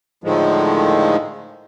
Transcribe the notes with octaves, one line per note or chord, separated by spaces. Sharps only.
A2 D3 D#3 F3 G#3